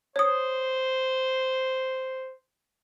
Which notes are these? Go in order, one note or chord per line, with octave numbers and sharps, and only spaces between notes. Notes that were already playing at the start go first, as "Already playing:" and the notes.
C5 C#5 D#6